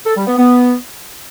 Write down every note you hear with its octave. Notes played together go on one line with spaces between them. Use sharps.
A4
G3
B3
B3